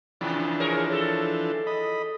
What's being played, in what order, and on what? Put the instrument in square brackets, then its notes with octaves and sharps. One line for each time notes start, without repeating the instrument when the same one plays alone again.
[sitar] C3 [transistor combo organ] E3 F3 D4
[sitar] G#4 A#4 C#5
A4
[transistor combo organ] D#5 B5